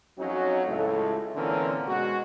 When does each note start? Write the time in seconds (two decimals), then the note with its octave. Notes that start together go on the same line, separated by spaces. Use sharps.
0.19 F2 F#3 C#4 D#4 F#4
0.68 C#2 A2 A3
1.36 A#2 D3 E3 C4 C#4 A#4
1.87 B2 G#3 F#4